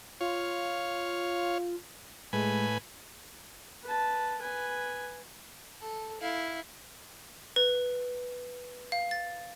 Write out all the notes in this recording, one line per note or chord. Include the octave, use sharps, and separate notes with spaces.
F4 C#5 F5
A2 G#3 B4 G#5
B4 A5
B4 G#5
A4
E4 F5
B4
F5
A6